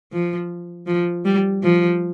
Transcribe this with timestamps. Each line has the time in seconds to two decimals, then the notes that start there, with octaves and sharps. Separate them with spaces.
0.13 F3
0.87 F3
1.25 G3
1.63 F3